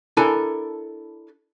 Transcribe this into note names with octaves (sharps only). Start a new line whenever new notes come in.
D4 E4 A4 A#4 G#5 A5